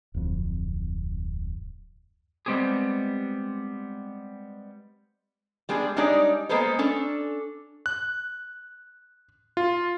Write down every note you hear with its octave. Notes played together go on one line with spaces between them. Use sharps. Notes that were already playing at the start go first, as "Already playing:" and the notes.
D1 F2
G3 G#3 B3 C4 G4 G#4
G3 G#3 B3 D4 G#4
G3 G#3 D4 D#4 C#5 D5
G#3 A#3 B3 A4 B4 C5
C#4 D4 A4
F#6
F4